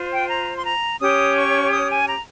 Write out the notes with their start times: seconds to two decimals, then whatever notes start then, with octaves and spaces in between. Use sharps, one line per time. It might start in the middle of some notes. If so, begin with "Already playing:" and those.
Already playing: F4 C5
0.11 G5
0.29 A#5
0.57 C6
0.64 A#5
1.00 C#4 G4 C#5 D#6
1.36 C#6
1.72 D#6
1.90 G#5
2.07 A#5